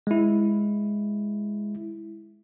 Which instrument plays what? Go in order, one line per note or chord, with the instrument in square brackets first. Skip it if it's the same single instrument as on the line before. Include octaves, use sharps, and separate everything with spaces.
[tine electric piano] G#3 E4